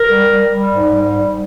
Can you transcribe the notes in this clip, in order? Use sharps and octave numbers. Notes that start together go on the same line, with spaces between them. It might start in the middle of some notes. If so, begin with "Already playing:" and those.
Already playing: A#4
G3
G3
G3
G#2
G3
G#2